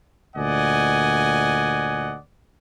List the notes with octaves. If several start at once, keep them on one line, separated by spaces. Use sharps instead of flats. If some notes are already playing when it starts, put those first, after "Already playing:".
D2 A#2 D5 D#5 F#5 G#5